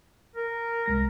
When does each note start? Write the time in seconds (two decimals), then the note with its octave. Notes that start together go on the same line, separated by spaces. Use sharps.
0.36 A#4
0.86 C2 G#3 A#6